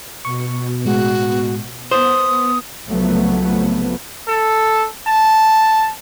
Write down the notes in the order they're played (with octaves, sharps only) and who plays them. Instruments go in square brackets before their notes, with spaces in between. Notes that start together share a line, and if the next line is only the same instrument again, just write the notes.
[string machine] B2 [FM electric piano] C#6
[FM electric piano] A2 G#3 [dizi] F#4
[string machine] B3 [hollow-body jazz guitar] C5 [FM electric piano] C6 [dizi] D#6
[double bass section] C2 C#3 F3 F#3 A3 B3
[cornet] A4
A5